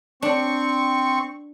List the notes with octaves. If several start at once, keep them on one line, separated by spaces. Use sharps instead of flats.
C4 D4 C#6